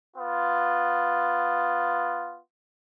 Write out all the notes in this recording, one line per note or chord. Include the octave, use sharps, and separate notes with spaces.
B3 F4